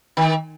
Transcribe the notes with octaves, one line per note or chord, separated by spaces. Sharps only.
D#3